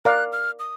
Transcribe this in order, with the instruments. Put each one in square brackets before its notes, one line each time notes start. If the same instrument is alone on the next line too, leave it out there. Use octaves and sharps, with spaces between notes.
[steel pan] A#4 D5 F5 [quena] F#6
[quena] F6
D#6